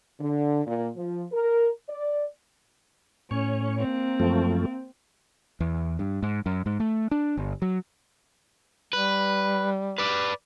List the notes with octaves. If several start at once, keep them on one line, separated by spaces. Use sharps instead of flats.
D3
A#2
F3
A#4
D5
A2 C#4 C#5
A#3 C4
F#2 F3 A3
E2
G2
G#2
F#2
G#2
A3
D4
G1
F#3
G3 B4
B4 D5